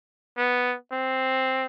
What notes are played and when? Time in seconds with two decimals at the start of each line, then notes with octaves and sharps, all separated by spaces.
0.37 B3
0.92 C4